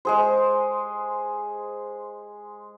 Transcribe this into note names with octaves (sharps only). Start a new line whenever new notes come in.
G#3 G#4 C5